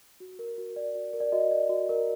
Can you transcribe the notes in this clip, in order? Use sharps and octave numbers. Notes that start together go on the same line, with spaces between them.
F#4
A#4
F#4
D5
F#4
A#4
D5
F#4 D#5
D5
F#4
A#4